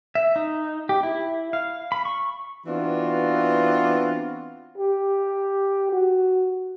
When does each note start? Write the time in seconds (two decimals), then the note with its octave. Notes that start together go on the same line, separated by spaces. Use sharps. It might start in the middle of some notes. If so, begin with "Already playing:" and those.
0.15 E5
0.36 D#4
0.89 G4
1.03 E4
1.53 F5
1.92 B5
2.05 C#6
2.66 E3 B3 C4 D4 F4 F#4
4.78 G4
5.92 F#4